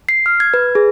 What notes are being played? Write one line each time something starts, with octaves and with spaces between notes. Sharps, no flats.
C7
F6
G#6
B4
G#4